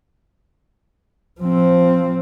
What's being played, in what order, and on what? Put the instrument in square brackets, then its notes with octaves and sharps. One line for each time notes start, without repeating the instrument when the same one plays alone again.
[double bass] F3 C4